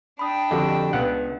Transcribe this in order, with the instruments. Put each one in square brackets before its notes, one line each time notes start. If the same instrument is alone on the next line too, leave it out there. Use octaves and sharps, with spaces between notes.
[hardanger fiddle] D4 G5 [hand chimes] B5 D#6
[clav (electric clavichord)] F2 D3 [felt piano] F#4 G4 D#5
[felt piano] C#2 [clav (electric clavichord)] B3 F#5